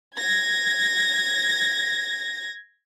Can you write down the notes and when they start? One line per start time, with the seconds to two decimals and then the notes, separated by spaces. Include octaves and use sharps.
0.18 G#6 A#6